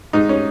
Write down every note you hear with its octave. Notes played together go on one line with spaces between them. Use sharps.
G#2 D#4
C#4